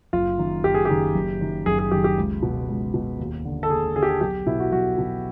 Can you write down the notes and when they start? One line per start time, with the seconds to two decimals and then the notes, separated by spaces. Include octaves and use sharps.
0.13 F#1 F4
0.38 F#2 D#3
0.64 F#1 G4
0.74 G#4
0.85 F#2 D#3 G4
1.15 F#1
1.41 F#2 D#3
1.66 F#1 G#4
1.79 G#4
1.91 F#2 D#3 G4
2.04 G4
2.17 C#2
2.42 B2
2.69 C#2
2.94 B2
3.19 D#2
3.45 D3
3.63 A4
3.70 D#2 G#4
3.95 D3 G#4
4.03 G4
4.09 G#4
4.21 B1 G4
4.47 B2 E4
4.60 F#4
4.72 B1 F#4
4.98 B2